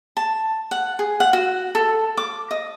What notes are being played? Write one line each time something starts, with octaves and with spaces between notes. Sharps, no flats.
A5
F#5
G#4
F#5
F#4
A4
D6
D#5